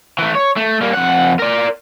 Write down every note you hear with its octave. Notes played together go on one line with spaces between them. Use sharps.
E3 A3
C#5
A3
G3 A#3
F2 F#5
A#4 D5